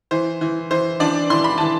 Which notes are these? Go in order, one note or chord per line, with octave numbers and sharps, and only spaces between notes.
E3 C5
E3
E3 C5
E3 D4 D5
E3 C6
B5
E3 A5